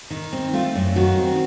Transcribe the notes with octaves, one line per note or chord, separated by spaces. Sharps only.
D#3
C4
A3 F4
F#2
D#3 F#4
C4